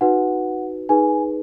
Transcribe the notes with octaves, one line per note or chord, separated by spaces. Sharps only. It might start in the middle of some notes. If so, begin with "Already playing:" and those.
D#4 F#4 B4 F#5
D#4 G#4 B4 G#5